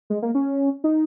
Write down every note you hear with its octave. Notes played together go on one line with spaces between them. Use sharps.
G#3
A#3
C#4
D#4